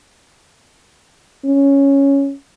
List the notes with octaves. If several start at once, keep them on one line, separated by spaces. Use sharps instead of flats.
C#4